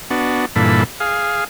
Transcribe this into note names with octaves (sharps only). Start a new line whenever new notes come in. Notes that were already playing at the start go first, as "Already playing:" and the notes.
B3 D4 F#4
G2 A#2 E3 A4 B5
G#4 F5